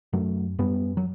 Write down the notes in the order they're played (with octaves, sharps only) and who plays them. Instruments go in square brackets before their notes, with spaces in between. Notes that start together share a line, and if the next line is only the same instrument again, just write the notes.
[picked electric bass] F#2 F#3 A3
F#2 G3 B3
F#3